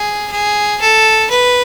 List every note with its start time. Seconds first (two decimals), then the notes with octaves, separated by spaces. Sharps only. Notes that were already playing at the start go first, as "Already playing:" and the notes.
Already playing: G#4
0.31 G#4
0.81 A4
1.31 B4